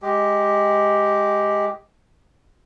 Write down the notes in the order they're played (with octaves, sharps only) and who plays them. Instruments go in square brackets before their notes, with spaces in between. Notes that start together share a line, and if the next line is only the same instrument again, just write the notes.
[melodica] G#3 G4